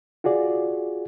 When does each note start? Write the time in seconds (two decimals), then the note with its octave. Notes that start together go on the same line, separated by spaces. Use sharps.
0.24 F4 F#4 G#4 D5